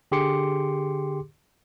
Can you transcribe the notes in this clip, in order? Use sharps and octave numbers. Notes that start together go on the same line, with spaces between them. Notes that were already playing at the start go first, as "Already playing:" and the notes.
D3 G4 G#4 C6 D6 C#7